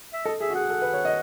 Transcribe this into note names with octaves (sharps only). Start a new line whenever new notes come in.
E5
A4 D#5
G#4 E5
F#4
G#4 F#5
A4
B4
C#5
D#5